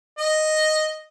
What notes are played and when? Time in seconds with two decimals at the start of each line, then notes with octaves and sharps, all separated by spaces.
0.18 D#5